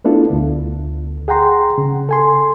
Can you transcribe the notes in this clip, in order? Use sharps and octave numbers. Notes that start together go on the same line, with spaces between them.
A3 B3 D4 E4 F4 A4
D2 D3
G#4 F#5 G5 A#5 C6
C#3
A4 G#5 C6